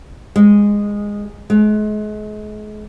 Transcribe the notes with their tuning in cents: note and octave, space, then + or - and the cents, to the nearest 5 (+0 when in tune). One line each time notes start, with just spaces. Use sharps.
G#3 -15
G#3 +35